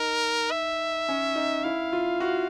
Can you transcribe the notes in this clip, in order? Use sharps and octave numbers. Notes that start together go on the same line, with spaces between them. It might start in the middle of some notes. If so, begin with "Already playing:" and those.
Already playing: D#4 A#4
E5
C#4
D#4
E4 F5
F4
F#4